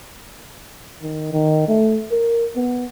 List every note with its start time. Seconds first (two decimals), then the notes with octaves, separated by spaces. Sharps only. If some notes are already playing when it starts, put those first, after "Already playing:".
1.02 D#3
1.32 D#3
1.68 A3
2.11 A#4
2.56 B3